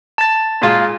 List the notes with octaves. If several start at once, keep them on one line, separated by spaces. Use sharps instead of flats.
A5 A6
A#2 G#3 F4